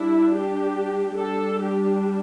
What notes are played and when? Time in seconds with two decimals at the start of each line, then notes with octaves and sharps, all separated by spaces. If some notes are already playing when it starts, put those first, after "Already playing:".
Already playing: G3 D4 E4
0.32 G4
1.16 G3 D4 A4
1.59 G4